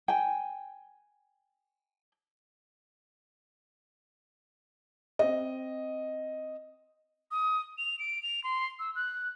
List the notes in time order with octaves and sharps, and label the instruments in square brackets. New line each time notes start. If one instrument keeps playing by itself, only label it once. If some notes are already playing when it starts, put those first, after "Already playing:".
[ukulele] G5 G#5
[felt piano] C4 D#5
[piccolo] D#6
F7
D7
F7
C6
E6
F#6